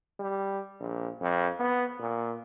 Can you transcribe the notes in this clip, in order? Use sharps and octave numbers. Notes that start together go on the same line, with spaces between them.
G3
A#1
F2
B3
A#2